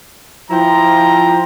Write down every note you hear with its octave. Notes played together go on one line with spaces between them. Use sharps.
F3 E4 G5 A#5